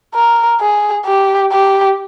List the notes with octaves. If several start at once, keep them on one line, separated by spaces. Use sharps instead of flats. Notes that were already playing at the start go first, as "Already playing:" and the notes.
A#4
G#4
G4
G4